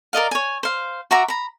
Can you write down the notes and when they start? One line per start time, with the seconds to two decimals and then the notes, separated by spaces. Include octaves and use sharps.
0.13 A#4 D5 D#5 F5
0.31 C#5 G#5
0.63 C5 F5
1.11 F#4 E5 A#5 D6
1.28 A#5 B5